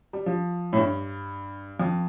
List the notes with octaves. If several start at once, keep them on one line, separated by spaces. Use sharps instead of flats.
G3
F3
A2
G2
F2